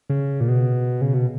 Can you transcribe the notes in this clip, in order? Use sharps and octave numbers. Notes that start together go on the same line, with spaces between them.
C#3
A#2
B2
C#3
B2